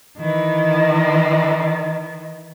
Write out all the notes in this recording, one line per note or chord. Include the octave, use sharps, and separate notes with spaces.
D#3 E3